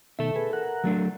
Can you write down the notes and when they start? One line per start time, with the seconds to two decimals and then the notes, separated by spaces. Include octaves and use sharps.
0.19 B2 D#3 A4 E5
0.36 G#4 B4
0.53 A#4 F#5
0.84 F#3 A3 D4